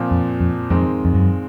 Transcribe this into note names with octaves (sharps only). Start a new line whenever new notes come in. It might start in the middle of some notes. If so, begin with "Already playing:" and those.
Already playing: A#2 F3 C4
F2
F2
F2 D#3 G#3 C4
F2
F#2